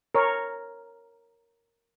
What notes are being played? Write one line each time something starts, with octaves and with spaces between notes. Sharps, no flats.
A#4 C#5